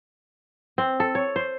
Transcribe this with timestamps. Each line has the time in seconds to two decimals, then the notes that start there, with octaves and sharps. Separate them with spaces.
0.78 C4
1.00 A4
1.15 C#5
1.36 C5